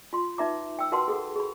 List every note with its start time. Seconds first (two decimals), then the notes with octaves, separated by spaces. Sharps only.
0.13 F4 C6
0.38 D#4 B4 E5 A#5 D6
0.79 G5 E6
0.92 F#4 A#4 B4 F#5 A5 C6
1.08 G#4 A4 F#5
1.36 G#4 B5